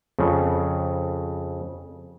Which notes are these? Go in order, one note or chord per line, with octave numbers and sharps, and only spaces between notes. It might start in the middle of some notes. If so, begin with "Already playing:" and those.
F2 C#3